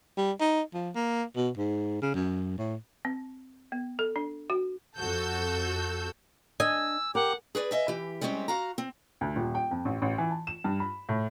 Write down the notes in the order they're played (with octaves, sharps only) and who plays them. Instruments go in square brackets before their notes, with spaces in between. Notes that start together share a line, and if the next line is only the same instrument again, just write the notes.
[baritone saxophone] G3
D#4
F3
A#3
B2
G#2
C#3
F#2
A2
[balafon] C4
B3
A4
D4
F#4
[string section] F2 F#4 A4 E6 G6
[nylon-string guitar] D4 D#5 [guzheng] G#5 [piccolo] E6
[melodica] G4 [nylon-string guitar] A#4 [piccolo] F#5
[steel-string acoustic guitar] G#4 B4 C5 D5
D#5 E5 G#5
E3 G4
G3 G#3 C4 C#4 G4
F#4 F5 A#5
C4
[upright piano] D2
D#1
G5
F2
A1
A1
E3
A5
E7
G2
B5
A2